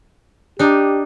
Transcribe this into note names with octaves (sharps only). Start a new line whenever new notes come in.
D4 D#4 G4